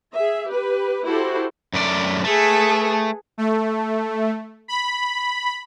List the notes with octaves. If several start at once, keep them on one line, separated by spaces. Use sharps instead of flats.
G#4 E5
G4 B4
E4 F#4 G4 A4 C5
F#2 A3 D5
A3 G#4 A4 B4
A3
B5